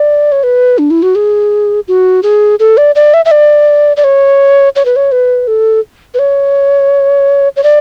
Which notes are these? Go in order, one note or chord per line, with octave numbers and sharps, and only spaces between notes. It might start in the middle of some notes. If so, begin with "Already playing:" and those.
Already playing: D5
C#5
B4
D4
E4
F#4
G#4
F#4
G#4
A4
D5
D5
E5
E5
D5
D5
C#5
C#5
B4
C#5
B4
A4
B4
C#5
C#5
D5